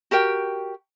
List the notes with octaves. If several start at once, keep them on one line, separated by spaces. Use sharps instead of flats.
F#4 G4 A#4 G5